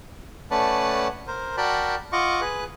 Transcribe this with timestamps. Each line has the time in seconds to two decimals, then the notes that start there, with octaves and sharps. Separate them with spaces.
0.51 A3 C#4 B4 D5 F#5 A5
1.27 A#4 C5
1.57 F#4 A#4 D5 G5 A5 B5
2.12 F4 D#5 F#5 C#6 D6
2.41 G#4 B4 F#6